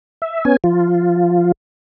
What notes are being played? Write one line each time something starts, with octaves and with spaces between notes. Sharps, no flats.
E5
B3 C#4 G#5
F3 F4